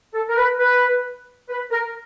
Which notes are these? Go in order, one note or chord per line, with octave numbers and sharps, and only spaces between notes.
A4
A#4
B4
B4
B4
A#4